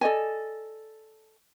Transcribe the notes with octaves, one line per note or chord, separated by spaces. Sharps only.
A4 D5 D#5 G#5